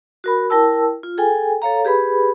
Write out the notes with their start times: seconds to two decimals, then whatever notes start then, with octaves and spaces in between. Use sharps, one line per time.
0.24 F#4 A#4 B5
0.50 E4 A#4 G5 A5 E6
1.03 F4
1.18 G#4 A4 G5 G#5
1.62 A4 C#5 F5 A#5
1.85 G4 G#4 B4 B5